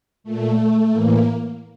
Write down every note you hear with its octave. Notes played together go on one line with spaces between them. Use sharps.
A#2 A3
A2 E3 A#3